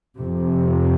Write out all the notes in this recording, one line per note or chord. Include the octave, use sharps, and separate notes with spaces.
F2 C3